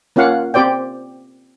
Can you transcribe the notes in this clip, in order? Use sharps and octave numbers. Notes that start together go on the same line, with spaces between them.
A#3 C#4 F4 F5 F#5
C4 G4 C5 D5 G5